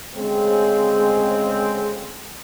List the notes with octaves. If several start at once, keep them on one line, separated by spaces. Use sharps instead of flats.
D2 C#3 G#3 C4 G#4